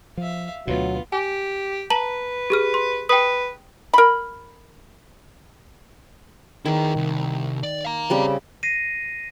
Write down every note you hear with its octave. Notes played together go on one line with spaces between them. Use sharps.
F3 E5 F5
D2 B2 F#3 B3 F4
G4 G#5
B4 A5 A#5 F#7
G4 G#4 F6
C6
B4 G5 D#6
A#4 B5
D#3 E4 G#4
C2
D5
F5 A#5
C#3 G3 C4
A#6 C7 D#7